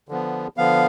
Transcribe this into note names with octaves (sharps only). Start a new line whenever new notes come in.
D3 F3 B3
D3 F3 B3 F5